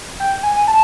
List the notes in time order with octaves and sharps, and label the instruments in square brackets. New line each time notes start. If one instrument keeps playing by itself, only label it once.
[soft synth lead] G5
G#5
A5